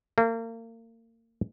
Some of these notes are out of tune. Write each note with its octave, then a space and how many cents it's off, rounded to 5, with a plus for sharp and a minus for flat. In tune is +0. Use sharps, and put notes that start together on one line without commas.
A#3 -35